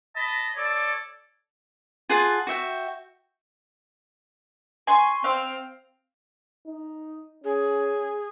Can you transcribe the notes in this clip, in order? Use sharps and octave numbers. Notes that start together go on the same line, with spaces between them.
D#5 A5 B5
A4 C#5 D5
F4 G#4 F#5 A5
F#4 E5 G5
G#5 C6 C#6
C4 F5
D#4
C#4 G#4